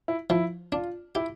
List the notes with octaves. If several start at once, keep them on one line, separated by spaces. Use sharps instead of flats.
E4
F3 E4
D4 F4
E4 G4